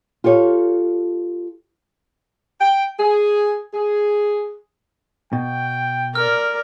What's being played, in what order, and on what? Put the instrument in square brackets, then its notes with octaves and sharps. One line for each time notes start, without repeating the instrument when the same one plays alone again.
[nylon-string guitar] F4 G4 A4 C#5
[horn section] G5
G#4
G#4
[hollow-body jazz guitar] B2 [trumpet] G5
[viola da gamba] A#4 D5 [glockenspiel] F6